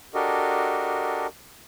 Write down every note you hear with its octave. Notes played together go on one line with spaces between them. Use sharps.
D4 F#4 G4 A4 A#4 D#5